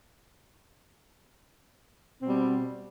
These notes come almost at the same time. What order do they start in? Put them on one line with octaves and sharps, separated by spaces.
C4 B2 G3